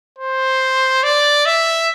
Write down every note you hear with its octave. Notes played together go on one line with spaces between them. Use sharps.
C5
D5
E5